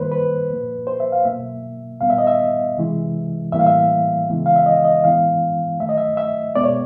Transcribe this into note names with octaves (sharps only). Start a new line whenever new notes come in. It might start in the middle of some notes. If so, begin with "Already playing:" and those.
Already playing: D#3 G3 A#3 B4 C5
B4
A#2 F3 A#3
C5
E5
F5
B2 F#3 A#3 E5
A#2 G3 B3 F5
E5
D#5
E5
C3 E3 G#3
A2 E3 G3 A#3 E5
F5
E5
C#3 E3 G#3 B3
F5
E5
D#5
D#5
A2 E3 G#3 B3 F5
D#3 F#3 A3 E5
D#5
E5
E5
B2 G#3 B3 D5
C#5